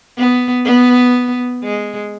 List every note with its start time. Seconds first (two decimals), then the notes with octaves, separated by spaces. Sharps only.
0.18 B3
0.65 B3
1.64 G#3